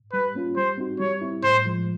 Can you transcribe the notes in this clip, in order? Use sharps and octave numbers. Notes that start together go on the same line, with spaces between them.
G3 B4
A#3 C#4 F4
G3 C5
C4 D#4 F#4
G3 C#5
C4 E4
A2 C5
F3 G#3